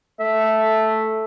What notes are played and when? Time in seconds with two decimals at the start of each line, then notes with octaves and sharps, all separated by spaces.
0.20 A3 E5